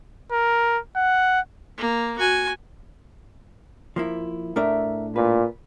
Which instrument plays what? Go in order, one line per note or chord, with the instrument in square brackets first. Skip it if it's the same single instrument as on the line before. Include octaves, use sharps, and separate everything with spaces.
[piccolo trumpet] A#4
F#5
[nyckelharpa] A#3
F#4 G#5
[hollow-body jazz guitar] F3 A#3 E4
[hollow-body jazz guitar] A2 A3 D4 [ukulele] A#4 E5
[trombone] A#2 [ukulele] B4